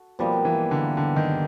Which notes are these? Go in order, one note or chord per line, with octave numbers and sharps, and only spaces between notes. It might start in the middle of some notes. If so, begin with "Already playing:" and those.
Already playing: F#4 A4
B2 F3 G3 A#3 D#4
E3
D3
D3
D#3